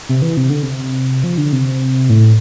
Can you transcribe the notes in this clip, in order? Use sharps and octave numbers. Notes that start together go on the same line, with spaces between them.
C3
E3
C3
D3
C3
F3
D3
C3
A2